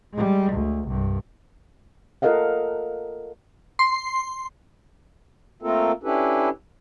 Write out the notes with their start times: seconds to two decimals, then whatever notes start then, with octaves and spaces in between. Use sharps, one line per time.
0.14 G3 G#3
0.53 D2
0.88 C2 G2
2.22 F4 A4 A#4 D#5 F5 F#5
3.79 C6
5.62 A3 A#3 C4 F4 A4 A#4
6.03 C#4 D4 E4 G4 A4 B4